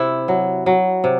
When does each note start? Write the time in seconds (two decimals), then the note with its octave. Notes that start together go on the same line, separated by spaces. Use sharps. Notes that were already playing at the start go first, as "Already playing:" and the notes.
Already playing: C3 E4
0.28 F#3
0.66 F#3
1.04 C3